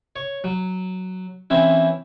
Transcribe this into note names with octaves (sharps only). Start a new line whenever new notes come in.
C#5
F#3
E3 C4 C#4 E4